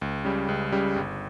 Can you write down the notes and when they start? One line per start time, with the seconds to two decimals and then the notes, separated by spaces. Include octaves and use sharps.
0.02 C#2
0.25 C#3 G3
0.49 C#2
0.72 C#3 G3
0.96 G1